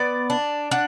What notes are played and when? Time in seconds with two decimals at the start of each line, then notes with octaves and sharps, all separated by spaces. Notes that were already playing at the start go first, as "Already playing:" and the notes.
Already playing: B3 D5
0.30 D4
0.71 D4 F#5